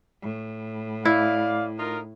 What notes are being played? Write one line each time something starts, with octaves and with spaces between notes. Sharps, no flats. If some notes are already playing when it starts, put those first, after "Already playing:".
A2
E4 D5 F5
D#4 F4 A#4